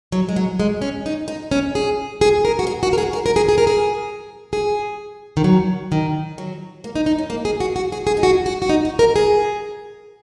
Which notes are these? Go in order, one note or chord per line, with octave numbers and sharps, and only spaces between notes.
F#3
G#3
F#3
G#3
C#4
D#4
D#4
C#4
G#4
G#4
A#4
F#4
G#4
F#4
A#4
G#4
A#4
A#4
G#4
G#4
A#4
G#4
G#4
D#3
F#3
D#3
F#3
A#3
D#4
D#4
C#4
A#3
G#4
F#4
F#4
G#4
G#4
D#4
F#4
F#4
F#4
D#4
F#4
A#4
G#4